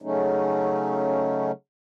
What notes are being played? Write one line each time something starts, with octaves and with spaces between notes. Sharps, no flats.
C#3 F#3 A3 C#4 D#4